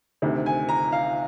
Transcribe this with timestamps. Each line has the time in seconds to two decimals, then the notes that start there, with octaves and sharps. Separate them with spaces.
0.22 D2 C3 D#3
0.46 G#5
0.69 A#5
0.92 F5